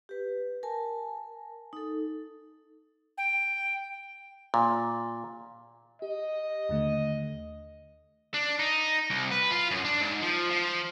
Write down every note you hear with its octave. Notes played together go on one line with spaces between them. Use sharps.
G4 B4
A#4 G#5 A5
D#4 A4
G5
A#2
G4 D#5
D#2 D3 A3
D4
D#4
C2
B4
F4
F#2
D4
G#2
F3
F3